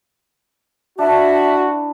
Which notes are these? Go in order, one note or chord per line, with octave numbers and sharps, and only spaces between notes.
D4 E4 F#4 B4 E5 A5